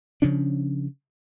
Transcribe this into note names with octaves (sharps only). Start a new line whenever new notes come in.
C#3 F3 C#4 D4